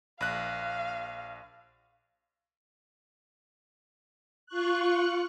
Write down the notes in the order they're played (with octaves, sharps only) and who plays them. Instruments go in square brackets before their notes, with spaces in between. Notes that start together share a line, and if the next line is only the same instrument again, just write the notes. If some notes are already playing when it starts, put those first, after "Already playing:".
[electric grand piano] A#1 F#6 [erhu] F5
[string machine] F4 C#6 F#6